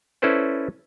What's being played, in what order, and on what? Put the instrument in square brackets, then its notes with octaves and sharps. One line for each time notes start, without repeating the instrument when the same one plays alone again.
[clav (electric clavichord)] C#4 E4 A4 B4 C5 D5